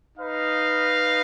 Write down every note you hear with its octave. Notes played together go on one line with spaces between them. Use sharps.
D#4 B4 F5